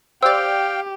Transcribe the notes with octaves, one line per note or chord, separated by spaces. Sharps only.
G4 C5 D5 F5 G5 E6